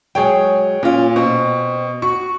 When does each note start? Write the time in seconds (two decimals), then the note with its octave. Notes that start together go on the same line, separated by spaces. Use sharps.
0.15 F#3 G#3 G#4 C#5 G5
0.83 A#2 C#4 F4
1.16 B2 C4
2.02 F#4 C#6